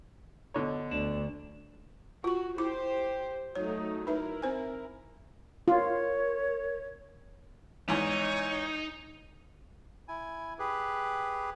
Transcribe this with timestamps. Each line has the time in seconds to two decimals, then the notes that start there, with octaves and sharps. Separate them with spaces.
0.54 B2 D3 C#5
0.91 D2 D4
2.24 F4 F#4 C#6
2.58 E4 G4 C5 D6
3.55 F#3 A3 D#4 C#5
4.07 D#4 E4 A#4 B4 E5
4.42 C4 C5 G#5
5.68 F4 A#4 C#5
7.89 E2 G#2 D#4 C#5
10.08 E4 G#5
10.59 G4 G#4 B4